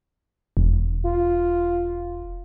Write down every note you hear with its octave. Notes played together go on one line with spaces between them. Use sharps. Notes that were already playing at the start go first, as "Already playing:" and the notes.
E1
F4